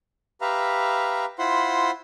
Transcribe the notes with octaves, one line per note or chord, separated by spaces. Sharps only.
G4 B4 E5 F5 A#5
E4 F4 C5 F#5 B5 C6